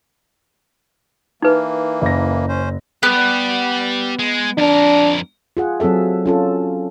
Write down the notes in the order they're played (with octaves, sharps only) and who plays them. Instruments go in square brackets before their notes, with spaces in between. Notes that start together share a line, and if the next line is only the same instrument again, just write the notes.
[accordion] E3 A#3 [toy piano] D#4 B4
[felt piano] F#1 A#6
[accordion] C#4 C5
[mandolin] B3 [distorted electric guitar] G4 D5
[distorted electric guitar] G#3
[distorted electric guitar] F2 A#4 [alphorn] D4
[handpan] F4 G#4 F#5
F#3 C4 G#4 A4 E5
C#4 F4 A4